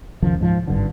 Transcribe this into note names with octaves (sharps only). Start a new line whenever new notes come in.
F#1 C#2 D#3 F3
G#2 F3
G#1 G2 D3